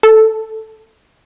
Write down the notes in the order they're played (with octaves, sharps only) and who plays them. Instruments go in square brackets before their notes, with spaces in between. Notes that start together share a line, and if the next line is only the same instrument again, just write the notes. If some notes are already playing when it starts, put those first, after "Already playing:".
[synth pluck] A4